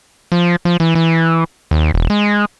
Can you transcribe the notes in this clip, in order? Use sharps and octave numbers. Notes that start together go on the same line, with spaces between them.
F3
F3
E3
E3
D#2
E1
G#3